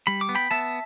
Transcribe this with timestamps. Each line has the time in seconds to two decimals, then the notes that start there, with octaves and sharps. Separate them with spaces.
0.07 G3 B5
0.21 D6
0.29 B3
0.35 G5 B5
0.51 B3 E5 A5